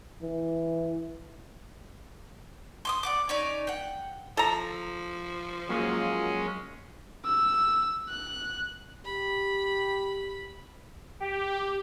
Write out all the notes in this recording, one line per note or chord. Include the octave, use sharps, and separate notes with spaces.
E3
C6 D6 D#6
D5 F#5 D6
C#4 D#4 C#5 D5
F#5 G5
F3 A4 A#5
F#3 G#3 A#3 C#4 F4
E6
F#6
G4 B5
G4